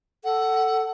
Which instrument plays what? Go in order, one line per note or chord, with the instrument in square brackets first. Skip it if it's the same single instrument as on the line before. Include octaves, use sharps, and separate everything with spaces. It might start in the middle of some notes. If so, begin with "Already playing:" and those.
[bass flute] A4 [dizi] F#5